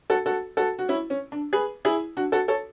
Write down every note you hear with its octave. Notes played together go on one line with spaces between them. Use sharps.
F#4 A4
F#4 A4
F#4 A4
F#4
C#4 E4
C#4
D4
G#4 B4
E4 G#4
D4 F#4
F#4 A4
A4 C#5